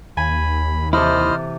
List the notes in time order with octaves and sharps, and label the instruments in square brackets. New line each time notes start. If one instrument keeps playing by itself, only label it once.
[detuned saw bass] D#2 [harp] G#5 [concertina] B5
[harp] C3 E3 A4 [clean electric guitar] E4 [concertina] C5 D#5 F6